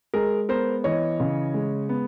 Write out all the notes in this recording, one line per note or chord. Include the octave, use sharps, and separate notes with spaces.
G#3 G#4 A#4
B3 A#4 C5
E3 C#5 D#5
C#3
G#3
B3